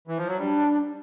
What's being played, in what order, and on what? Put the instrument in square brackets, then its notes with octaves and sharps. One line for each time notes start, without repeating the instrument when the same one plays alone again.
[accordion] E3
F3
F#3
[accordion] G3 [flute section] D4